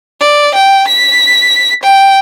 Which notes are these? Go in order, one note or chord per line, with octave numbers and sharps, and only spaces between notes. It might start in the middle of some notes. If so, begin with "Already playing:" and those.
D5
G5
B6
G5